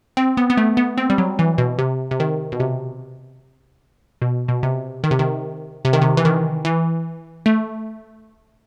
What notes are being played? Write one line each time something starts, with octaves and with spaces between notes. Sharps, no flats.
C4
B3
B3
A3
B3
C4
G3
F#3
E3
B2
C3
C3
D#3
B2
C3
B2
B2
C3
D#3
C3
D#3
C3
D#3
C3
E3
D#3
E3
A3